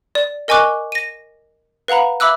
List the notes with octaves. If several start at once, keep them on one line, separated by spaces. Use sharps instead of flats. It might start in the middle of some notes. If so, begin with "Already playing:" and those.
D5
A#4 D#5 G#5 C#6 D6 F#6
A#6 D#7
B4 F5 F#5 A#5 B5
E5 B5 D6 E6 F#6